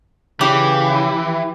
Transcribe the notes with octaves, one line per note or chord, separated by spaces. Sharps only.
C#3 E3 G4